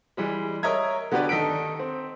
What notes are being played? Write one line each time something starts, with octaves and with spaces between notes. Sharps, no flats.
E3 G3 G#3
A#4 C#5 D#5 E5 A#5 G#6
D3 B3 F#4 G4 B4 D5
D#3 D#4 A4 B6 D7
C4